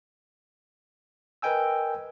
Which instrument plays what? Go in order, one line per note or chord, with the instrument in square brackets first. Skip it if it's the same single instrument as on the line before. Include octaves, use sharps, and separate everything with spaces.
[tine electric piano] A#4 B4 D#5 G5 G#5 E6